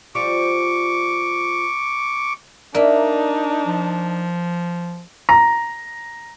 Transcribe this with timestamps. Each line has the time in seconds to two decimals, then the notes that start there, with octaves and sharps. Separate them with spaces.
0.15 F3 G3 F4 C#6 D6
2.75 A#3 D4 D#4 D5 E5
3.67 F3
5.29 A#5